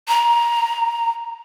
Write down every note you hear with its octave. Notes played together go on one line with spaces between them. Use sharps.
A#5